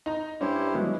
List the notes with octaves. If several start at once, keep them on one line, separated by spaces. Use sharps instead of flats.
D#4 A#5
G2 C#4 E4 G4 C5
E3 F#3 G#3